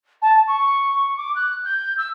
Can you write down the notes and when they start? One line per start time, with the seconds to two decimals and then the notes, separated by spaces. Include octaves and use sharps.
0.22 A5
0.47 C#6
1.17 D6
1.35 F#6
1.65 G6
1.98 E6